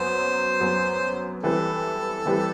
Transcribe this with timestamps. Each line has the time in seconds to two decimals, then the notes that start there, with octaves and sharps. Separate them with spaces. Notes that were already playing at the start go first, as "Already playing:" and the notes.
Already playing: F#2 F#3 B3 C5
0.60 F#2 F#3 B3
1.43 E3 G3 C4 G4 A4 B4
2.26 E3 G3 C4 G4 B4